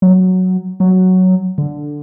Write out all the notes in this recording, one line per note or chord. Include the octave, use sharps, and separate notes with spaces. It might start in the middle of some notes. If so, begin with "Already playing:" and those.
F#3
F#3
D3